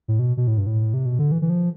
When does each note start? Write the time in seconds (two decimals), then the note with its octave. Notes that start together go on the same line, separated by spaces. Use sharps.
0.08 A2
0.19 B2
0.37 B2
0.47 A2
0.58 G2
0.67 A2
0.94 C3
1.06 B2
1.19 D3
1.32 E3
1.42 E3
1.50 F3